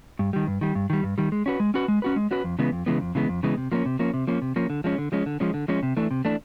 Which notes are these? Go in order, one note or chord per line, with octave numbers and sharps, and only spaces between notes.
G2
D#3 G3
G2
D#3 G3
G2
D#3 G3
G2
D#3 G3
G#3
C#4 F#4 B4
G#3
C#4 F#4 B4
G#3
C#4 F#4 B4
G#3
C#4 F#4 B4
F2
C#3 E3 G#3 B3
F2
C#3 E3 G#3 B3
F2
C#3 E3 G#3 B3
F2
C#3 E3 G#3 B3
C3
F3 A#3 C#4
C3
F3 A#3 C#4
C3
F3 A#3 C#4
C3
F3 A#3 C#4
D3
F3 G#3 C#4
D3
F3 G#3 C#4
D3
F3 G#3 C#4
D3
F3 G#3 C#4
C3
E3 A3 D4
C3
E3 A3 D4